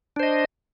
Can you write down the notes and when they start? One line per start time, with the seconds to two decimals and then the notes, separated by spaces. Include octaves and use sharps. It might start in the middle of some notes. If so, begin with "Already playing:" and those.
0.16 D4
0.20 C5
0.23 D#5